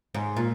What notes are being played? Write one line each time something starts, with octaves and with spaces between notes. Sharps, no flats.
G#2
A#2